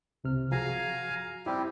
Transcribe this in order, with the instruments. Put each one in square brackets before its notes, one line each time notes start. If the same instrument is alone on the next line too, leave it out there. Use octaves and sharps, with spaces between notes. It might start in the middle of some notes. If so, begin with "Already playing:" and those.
[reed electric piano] C2 C3 F6
[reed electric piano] F3 F#4 G#4 [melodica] F5 G#5 A#5
[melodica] G3 C4 G4 [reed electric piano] E4